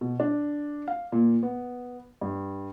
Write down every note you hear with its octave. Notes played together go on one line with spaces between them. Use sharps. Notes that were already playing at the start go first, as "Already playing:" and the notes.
B2
D4
F5
A#2
B3
G2